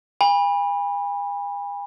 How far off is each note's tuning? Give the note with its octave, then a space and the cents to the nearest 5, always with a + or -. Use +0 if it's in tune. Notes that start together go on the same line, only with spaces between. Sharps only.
G#5 -45 B5 -15